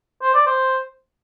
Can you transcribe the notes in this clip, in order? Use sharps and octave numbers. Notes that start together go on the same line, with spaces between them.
C5
D5
C5